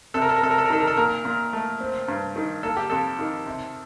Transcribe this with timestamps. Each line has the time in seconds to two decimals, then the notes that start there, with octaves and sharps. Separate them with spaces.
0.14 C3 A4
0.22 A#4
0.29 A4
0.36 A#4
0.42 C3 A4
0.51 A#4
0.58 A4
0.65 A#4
0.70 D#3 A4
0.80 A#4
0.87 A4
0.97 A#2 A#4
1.25 A#2
1.53 A3
1.81 C4
2.08 G2
2.36 D#3
2.63 A#3 A4
2.77 G4
2.90 F2 A4
3.19 D#3
3.46 C3